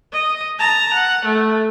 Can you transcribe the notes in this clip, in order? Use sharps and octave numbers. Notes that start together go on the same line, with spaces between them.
D#5
A5 A#5
F#5
A3